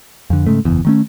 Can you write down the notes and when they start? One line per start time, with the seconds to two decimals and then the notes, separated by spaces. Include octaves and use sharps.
0.30 F2 D3
0.46 G#2 C#3 A3
0.65 F#1 E2
0.85 D#3 A3 C#4